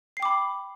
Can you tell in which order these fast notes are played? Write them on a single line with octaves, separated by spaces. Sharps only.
C7 G5 D6 B5